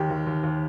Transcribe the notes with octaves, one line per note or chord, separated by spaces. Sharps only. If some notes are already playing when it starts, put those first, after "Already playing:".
Already playing: D#2 D#3 G4
D#2
D#2
D#2